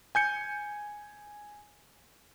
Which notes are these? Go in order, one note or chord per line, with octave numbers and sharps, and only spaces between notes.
G#5 G6 C#7